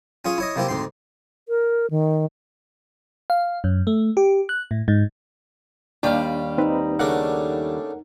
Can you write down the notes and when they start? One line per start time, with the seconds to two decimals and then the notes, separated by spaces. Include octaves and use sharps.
0.25 C#4 F4 G#4 C#5
0.38 E4 C#5 D#5
0.56 C3 A#3 C4 E4 G4
0.68 D2 G#2 C4 C6
1.49 A#4
1.91 D#3
3.30 F5
3.64 F#2
3.87 A3
4.17 G4
4.49 F#6
4.71 A2
4.88 G#2
6.03 D#2 G3 D4 F5 G5
6.58 C4 D#4 B4
6.99 C#3 A3 D4 A#4 F#5